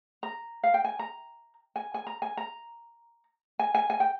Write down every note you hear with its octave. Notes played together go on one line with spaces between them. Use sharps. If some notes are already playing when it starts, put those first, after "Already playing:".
A#5
F5
G5
G#5
A#5
G#5
G#5
A#5
G#5
A#5
G#5
G#5
G#5
G5